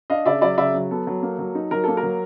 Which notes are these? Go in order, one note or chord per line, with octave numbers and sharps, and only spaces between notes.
D4 D#5 F5
C#3 D5 E5
F#3 D5 E5
C#3 D5 E5
F#3
B3 A4
F#3
A#3
F#3
D#4
F#3 A#4
A#3 A4
A#4
F#3